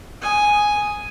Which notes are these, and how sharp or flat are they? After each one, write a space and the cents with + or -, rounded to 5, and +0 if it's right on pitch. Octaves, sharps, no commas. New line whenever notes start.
G#5 +0 D#6 +0